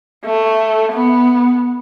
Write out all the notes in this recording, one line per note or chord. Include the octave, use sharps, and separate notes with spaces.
A3
B3